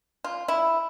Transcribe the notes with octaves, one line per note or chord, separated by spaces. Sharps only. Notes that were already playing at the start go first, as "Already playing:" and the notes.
F4
E4